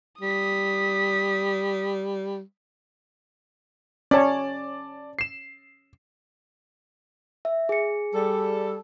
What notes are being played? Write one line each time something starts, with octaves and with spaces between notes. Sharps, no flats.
G3 D#6 B6
C#4 C#5 D5 A5
C7 E7
E5
G#4 C#7
G3 A4